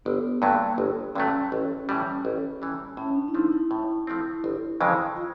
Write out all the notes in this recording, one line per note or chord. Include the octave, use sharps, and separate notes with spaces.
G1 B3
G2 D3 F#3 A3 A#3
G1
G2 D3 F#3 A3 C#4
A1
A2 E3 G3
A1
A2 E3 G3
A2 C#4
D4
E4
F3 A3 C4 D#4
E4
A2
F3 A3 C4
G1
F2 C#3 E3 G#3
F4